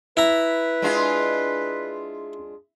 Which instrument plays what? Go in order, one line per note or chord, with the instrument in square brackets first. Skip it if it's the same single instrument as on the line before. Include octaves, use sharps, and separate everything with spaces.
[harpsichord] E4 A#5 [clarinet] B4
[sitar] G#3 D4 F4